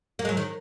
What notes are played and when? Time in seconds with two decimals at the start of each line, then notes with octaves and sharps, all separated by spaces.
0.19 A#3
0.25 G#3
0.29 F#3
0.37 D#3